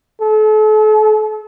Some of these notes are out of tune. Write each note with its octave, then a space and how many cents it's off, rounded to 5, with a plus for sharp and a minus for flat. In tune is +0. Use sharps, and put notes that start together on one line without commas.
A4 -40